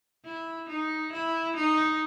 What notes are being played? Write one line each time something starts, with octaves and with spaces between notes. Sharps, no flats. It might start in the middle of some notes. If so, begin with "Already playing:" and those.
E4
D#4
E4
D#4